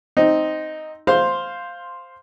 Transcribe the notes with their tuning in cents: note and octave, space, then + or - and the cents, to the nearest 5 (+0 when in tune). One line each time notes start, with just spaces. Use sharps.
C4 +0 D#4 +0
C5 +0 F5 +0 C6 +5